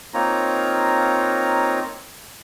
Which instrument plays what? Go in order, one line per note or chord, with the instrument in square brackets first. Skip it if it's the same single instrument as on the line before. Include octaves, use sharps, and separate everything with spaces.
[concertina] A#3 C4 D#4 F4 C#5 A#5